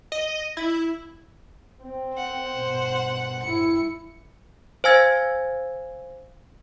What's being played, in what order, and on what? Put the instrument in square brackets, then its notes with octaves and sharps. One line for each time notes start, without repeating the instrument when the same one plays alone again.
[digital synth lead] D#5
E4
[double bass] C4
[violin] C5 F#5
[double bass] G2 B2
[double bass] G2 E4 [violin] C#7
[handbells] C5 F5 G#5 E6 G#6 A6